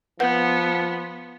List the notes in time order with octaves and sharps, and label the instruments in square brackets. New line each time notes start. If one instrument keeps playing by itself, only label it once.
[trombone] F3 [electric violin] B3 [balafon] B4 F#5